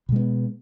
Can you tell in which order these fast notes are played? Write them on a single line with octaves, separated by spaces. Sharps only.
B2 G#3 B3